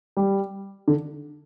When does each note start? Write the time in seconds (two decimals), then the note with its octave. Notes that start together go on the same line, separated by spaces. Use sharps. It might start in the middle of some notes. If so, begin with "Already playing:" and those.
0.17 G3
0.88 D3